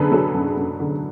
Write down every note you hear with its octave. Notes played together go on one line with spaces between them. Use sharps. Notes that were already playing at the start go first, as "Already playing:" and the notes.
Already playing: F#2 D3 G#4 A4 B4
F#3 A4
F#2
F#2
D3